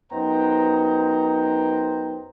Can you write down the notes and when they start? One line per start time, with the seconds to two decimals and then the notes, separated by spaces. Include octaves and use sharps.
0.12 F#2 B3 D#4 C5 G5 A#5